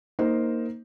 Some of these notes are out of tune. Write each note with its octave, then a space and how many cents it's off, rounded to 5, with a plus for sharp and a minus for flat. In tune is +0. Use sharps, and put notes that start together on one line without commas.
A#3 +0 D#4 +10 C5 +0